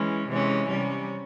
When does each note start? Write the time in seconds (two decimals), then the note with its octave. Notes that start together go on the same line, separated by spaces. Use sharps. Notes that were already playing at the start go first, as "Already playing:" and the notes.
Already playing: E3 G#3 C#4
0.28 C3 E3 G#3 C#4
0.68 C3 G3 C#4